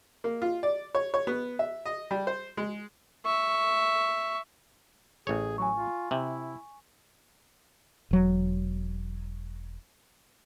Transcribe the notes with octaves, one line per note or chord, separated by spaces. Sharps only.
A#3
F4
D5
C#5
C#5
B3
E5
D#5
G3
C5
G#3
E5 C#6
A1 G#4 C#5
F#3 G#5 C#6
F4
C3 E4
E1 F#3